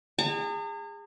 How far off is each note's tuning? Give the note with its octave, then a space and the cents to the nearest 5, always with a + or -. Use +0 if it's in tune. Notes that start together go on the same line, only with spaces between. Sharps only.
G#4 -30 A#5 -45